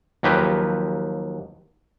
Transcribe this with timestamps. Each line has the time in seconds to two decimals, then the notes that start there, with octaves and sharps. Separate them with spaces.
0.23 D#2 F3 F#3 G4 B4 G5